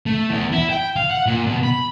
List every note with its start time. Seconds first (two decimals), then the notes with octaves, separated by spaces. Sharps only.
0.06 A3
0.30 E2
0.52 E4
0.70 G5
0.96 F5
1.11 F#5
1.26 A#2
1.46 B2
1.63 B5